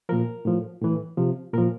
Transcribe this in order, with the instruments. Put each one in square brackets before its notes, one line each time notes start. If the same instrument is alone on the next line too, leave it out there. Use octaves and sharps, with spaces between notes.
[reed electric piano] A#2 F3 A#4
A2 F3
A2 E3
C3 F3
A#2 A#4
F3